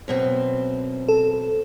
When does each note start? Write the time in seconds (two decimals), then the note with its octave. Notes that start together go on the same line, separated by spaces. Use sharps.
0.08 F#2 B2 C4
1.08 A4